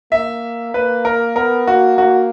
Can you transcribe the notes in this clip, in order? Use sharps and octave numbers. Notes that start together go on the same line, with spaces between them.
A#3 E5
A#3 B4
A#4
B3 A#4
A#3 F#4
A#3 F#4